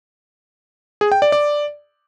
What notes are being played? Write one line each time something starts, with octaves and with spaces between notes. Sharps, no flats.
G#4
G5
D5
D5